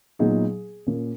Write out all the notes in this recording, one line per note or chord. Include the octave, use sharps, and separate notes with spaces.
A#2 F#3 B3 D#4 G#4
A#2 A#3 C#4